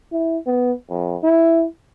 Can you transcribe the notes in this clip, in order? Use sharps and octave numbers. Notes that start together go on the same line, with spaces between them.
E4
B3
F2
E4